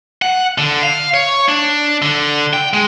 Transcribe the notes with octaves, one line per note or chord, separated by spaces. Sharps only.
F#5
D3
F5
C#5
D4
D3
G5
G#3